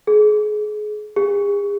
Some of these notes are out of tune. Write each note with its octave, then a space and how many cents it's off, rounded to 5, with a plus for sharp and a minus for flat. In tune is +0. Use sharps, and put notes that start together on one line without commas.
G#4 +30
G#4 -40